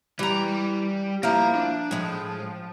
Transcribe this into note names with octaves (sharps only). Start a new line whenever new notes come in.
E3 G3 A#5
F3 A#3 E4 A#5
D4
A2 F3 G#3